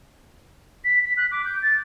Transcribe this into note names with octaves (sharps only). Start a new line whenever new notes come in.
B6
B6
F#6
D6
G6
A6